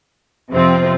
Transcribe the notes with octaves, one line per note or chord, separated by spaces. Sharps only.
F2 C3 F3 C4 F4